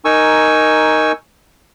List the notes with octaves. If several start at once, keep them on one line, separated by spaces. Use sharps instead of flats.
D#4 A#4 G#5 C#6 E6